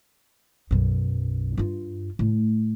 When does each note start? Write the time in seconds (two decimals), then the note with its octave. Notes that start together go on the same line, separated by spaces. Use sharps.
0.71 B1 F#2
1.58 G2 F4
2.19 A2 A3